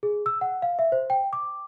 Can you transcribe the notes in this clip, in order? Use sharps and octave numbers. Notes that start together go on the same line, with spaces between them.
G#4
E6
F#5
F5
E5
C5
G5
D6